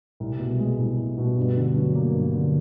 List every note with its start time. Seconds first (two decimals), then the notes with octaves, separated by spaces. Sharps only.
0.20 C2
0.39 B2
0.59 G#3
0.78 C2
0.98 C2
1.18 B2
1.37 G2
1.56 D3
1.76 F#3
1.95 A#3
2.14 G2
2.34 D3